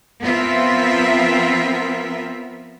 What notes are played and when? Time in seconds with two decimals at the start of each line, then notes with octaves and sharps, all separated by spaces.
0.20 F3 B3 C4 F4 A#4 E5